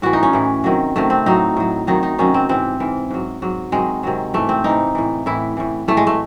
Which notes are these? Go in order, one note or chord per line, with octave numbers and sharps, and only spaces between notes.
A2 E3 F#4
D#4
C#4
A2 E3
C3 D#3 F#3
C3 D#3 F#3 A3
C4
A2 F#3 D#4
A2 F#3
C3 D#3 F#3 D#4
D#4
C3 D#3 F#3 C#4
C4
G#2 E3 C4
G#2 E3
G#2 F#3
G#2 F#3
C3 D#3 F#3 G#3
C3 D#3 F#3
G#2 E3 A3
C4
G#2 E3 D#4
A2 E3
A2 E3 E4
A2 E3
A2 E3 A3
G#3
A3